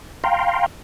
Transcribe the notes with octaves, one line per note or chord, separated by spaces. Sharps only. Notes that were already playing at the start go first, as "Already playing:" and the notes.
F5 G5 A#5 C6